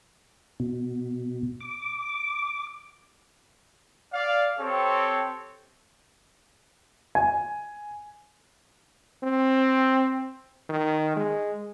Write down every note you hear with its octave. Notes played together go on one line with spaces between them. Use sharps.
B2
D6
D5 F5
C4 G4 A4 C#5
G#5
C4
D#3
G#3